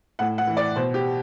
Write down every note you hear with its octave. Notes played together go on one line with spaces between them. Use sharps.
A2 F#5
F#5
E3
D5
B2 C5
G4